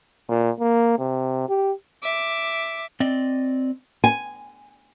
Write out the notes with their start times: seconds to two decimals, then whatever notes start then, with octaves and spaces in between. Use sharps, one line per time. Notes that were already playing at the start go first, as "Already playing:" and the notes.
0.29 A#2
0.60 A#3
0.98 C3
1.49 G4
2.03 E5 D6
3.00 C4 D5 D#5
4.04 G#5